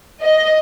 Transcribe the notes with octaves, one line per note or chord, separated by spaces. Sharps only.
D#5